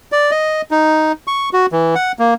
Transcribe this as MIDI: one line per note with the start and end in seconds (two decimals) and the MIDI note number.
0.12 0.31 74
0.31 0.62 75
0.71 1.12 63
1.27 1.49 85
1.53 1.66 66
1.72 1.95 52
1.95 2.12 78
2.19 2.34 58